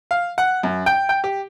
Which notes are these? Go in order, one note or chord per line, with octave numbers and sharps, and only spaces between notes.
F5
F#5
F#2
G5
G5
G4